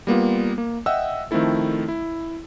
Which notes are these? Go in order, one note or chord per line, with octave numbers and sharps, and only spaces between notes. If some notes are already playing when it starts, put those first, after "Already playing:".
G3 A#3 B3 F4
A#3
D#5 E5 F#5 G5 E6
D#3 F3 A3 C4 E4 A4
E4